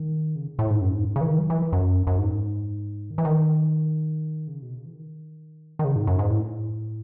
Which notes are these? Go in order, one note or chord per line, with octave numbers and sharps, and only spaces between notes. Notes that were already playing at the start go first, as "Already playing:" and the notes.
Already playing: D#3
C#3
A2
G#2
F#2
G#2
C#3
E3
D#3
F#3
E3
F#2
F#2
G#2
D#3
E3
D#3
C#3
B2
C#3
E3
D#3
D#3
C#3
G#2
F#2
G#2
A2